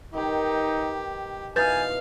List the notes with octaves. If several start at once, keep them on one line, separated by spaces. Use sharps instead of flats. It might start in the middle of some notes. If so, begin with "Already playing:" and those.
D#3 D#4 G4 B4
B2 E3 D#4 B4 F5 G#5 G6 A6